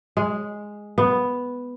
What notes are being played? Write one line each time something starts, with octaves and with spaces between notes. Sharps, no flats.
G#3
B3